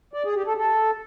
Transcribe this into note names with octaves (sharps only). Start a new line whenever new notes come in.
D5
G#4
G4
A4
A4